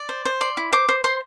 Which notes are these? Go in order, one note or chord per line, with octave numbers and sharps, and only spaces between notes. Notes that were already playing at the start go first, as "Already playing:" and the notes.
Already playing: D5
C5
C5
D5 C6
E4
C5 D6
C5
C5 C6